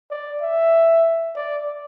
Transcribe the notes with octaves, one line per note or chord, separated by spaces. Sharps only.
D5
E5
D5